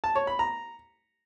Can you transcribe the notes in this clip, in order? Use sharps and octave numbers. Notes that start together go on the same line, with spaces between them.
A5
C#5
B5
A#5